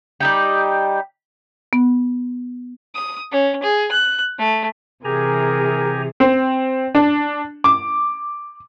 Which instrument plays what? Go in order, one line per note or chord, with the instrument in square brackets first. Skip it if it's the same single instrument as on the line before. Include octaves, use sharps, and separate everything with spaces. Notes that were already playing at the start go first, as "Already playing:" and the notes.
[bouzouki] G3 D#4 G4
[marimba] B3
[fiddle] D#6
C#4
G#4
F#6
A3
[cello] C3 E3 [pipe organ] G4 G#5 A#5 [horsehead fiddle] G#4 [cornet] A#4
[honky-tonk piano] C4
D4
D6